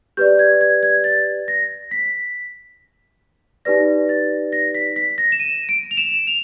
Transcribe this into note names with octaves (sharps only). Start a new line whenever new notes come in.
G4 B4 D5 G6
G#6
G#6
G#6
A6
A#6
B6
D#4 G4 B4 D5 A#6
A6
A#6
B6
B6
A#6
E7
D#7
D7
F7
E7
F7